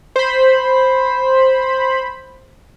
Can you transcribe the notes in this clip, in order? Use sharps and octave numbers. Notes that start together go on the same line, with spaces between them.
C5 B5